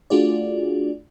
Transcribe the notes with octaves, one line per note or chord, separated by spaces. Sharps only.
A3 D4 F4 F#4 G#4 D5